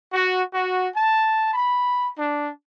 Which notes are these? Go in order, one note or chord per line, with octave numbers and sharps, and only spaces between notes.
F#4
F#4
A5
B5
D4